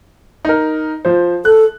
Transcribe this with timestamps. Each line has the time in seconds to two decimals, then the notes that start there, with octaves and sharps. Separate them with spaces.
0.45 D#4 A#4
1.05 F3 C5
1.45 A4 F#6